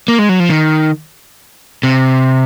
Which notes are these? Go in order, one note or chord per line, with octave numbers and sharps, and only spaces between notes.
A#3
G#3
F#3
F3
D#3
C3